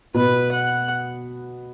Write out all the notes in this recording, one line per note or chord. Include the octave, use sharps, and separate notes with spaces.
B2 B3 B4
F#5